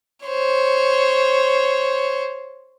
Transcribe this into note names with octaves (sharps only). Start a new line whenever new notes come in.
C5 C#5